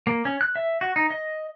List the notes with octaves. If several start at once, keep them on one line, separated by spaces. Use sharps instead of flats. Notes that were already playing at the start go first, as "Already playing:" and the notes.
A#3
C#4
F#6
E5
F#4
D#4
D#5